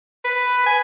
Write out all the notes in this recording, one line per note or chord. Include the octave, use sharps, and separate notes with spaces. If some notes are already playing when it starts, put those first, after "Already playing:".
B4
G#5